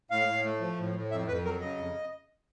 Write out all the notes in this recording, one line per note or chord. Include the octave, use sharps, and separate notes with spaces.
A2 F5
A2
A3
F3
A2
A2
F2 E5
F2 B4
F#3 A#4
C#3 D#5
F2